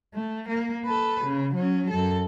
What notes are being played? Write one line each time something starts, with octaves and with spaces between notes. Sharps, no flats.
A3
A#3
A4 B4
C#3
F#3 C#4
F#2 A4